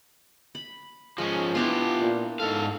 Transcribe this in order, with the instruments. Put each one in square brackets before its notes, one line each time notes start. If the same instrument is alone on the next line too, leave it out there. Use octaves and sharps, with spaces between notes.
[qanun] B5
[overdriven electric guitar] F3 C#4 [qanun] G#3
[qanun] B3 D4 E4 [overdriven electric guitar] F4 G4
[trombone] A#2
[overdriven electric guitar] G#2 F5 [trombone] A4